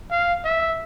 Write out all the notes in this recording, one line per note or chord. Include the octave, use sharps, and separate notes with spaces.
F5
E5